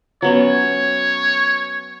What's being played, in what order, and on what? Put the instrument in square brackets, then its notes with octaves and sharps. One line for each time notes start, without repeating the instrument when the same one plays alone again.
[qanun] F#3 B3 C#4 [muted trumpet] C#5